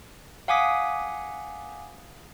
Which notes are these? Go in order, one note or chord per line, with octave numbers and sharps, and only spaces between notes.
F5 F#5 G#5 D6 D#6 B6